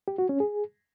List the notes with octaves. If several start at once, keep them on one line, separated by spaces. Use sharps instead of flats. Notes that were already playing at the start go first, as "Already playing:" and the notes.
G4
F#4
C#4
G#4